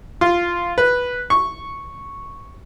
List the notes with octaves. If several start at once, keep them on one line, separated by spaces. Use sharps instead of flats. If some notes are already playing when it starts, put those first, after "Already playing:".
F4
B4
C#6